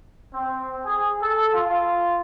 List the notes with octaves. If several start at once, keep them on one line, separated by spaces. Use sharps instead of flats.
C4
G#4
A4
F4